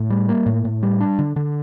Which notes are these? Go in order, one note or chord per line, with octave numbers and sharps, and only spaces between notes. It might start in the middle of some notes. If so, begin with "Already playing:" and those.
Already playing: A2
G3
A#3
A2
A2
G3
D4
D3
D3